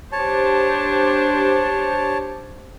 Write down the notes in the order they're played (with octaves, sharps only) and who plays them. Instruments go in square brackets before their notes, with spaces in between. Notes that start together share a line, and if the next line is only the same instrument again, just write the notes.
[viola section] D4 G4 C5 [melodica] C#5 A5